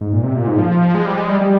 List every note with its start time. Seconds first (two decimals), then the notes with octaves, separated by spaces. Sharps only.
0.01 G#2
0.13 A#2
0.24 C3
0.36 A#2
0.47 G#2
0.59 F3
0.95 G#3
1.06 G3
1.18 G#3
1.29 G3
1.41 G3